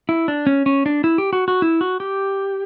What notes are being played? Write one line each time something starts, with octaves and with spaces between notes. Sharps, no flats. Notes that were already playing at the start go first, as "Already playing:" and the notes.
E4
D4
C#4
C#4
D4
E4
G4
F#4
F#4
E4
F#4
G4